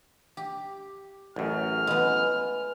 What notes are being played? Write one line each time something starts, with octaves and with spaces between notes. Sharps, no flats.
G4
A1 F#2 F6
G#3 B3